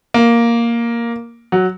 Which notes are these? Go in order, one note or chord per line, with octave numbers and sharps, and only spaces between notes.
A#3
F#3